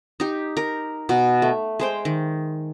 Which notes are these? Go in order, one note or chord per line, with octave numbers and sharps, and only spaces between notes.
D#4 G4
A#4
B2
A3
G#3 C5 G5
D#3